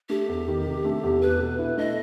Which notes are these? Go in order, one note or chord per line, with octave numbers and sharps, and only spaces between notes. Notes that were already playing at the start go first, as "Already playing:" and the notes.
A3 G4
E2
D#3
C3
A3
E2
A4 B4
B2
E4
A3 D#5